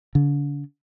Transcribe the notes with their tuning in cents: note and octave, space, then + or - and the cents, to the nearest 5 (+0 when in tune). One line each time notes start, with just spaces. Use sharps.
D3 -40